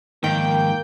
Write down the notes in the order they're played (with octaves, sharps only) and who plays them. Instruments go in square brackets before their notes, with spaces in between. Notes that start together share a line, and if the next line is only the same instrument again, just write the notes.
[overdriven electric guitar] G#2 F3 [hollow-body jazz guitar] D#3 [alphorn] A#3 [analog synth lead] G5